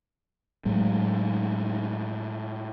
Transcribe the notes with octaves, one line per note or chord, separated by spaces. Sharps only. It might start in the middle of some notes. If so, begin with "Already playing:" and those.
A2 F#3 G#3